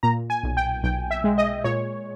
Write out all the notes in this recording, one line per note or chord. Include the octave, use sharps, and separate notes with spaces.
A#2 A#5
G#5
B1
G5
B1 G5
E5
G#3
D#5
A#2 C#5